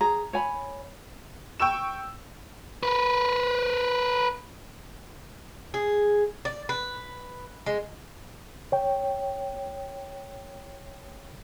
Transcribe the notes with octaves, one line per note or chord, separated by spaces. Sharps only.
G#4 A#5
C#5 G#5 B5
G5 C#6 E6 E7
A#4 B4
G#4
D5
B4
G#3
C#5 G5